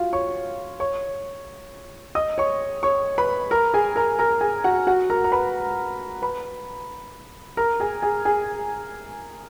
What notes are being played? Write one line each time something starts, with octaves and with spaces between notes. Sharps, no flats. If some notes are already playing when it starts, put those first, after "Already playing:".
Already playing: F4 F#4 F5
C#5 C#6
C#5 C#6
D#5 D#6
C#5 C#6
C#5 C#6
B4 B5
A#4 A#5
G#4 G#5
A#4 A#5
A#4 A#5
G#4 G#5
F#4 F#5
F#4 F#5
A#4 A#5
A#5
B4 B5
B4 B5
A#4 A#5
G#4 G#5
G#4 G#5
G#4 G#5